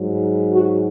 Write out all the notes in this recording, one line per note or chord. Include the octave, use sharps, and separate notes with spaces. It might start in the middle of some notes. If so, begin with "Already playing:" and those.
Already playing: G#2 F#3
F#4